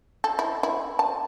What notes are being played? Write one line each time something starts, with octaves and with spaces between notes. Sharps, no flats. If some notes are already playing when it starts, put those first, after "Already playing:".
A4
E4
E4
A5